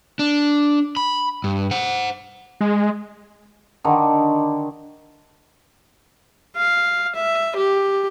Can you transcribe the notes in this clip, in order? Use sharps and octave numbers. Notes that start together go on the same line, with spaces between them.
D4
B5
G2
C5 F#5
G#3
D3 D#3
F5
E5
G4